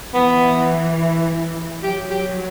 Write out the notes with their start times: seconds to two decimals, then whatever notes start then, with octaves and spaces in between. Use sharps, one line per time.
0.14 E3 B3
1.83 F#3 G4
2.10 G4